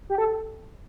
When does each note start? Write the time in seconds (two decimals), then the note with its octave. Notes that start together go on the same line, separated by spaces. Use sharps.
0.10 G4
0.18 A4